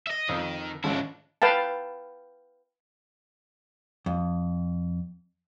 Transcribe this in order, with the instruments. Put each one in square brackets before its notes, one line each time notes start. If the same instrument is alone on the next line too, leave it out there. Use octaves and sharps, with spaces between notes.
[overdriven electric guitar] D#5 E5
[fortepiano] F2 D#6 [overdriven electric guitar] D#3
[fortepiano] G#1 F3 C#4 [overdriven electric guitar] D4 E4
[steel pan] B4 F5 G5 A5
[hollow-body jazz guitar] F2